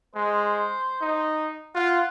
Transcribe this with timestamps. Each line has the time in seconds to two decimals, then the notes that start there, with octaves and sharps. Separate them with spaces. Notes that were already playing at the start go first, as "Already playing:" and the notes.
0.15 G#3 C5
1.01 D#4
1.75 F4 F#5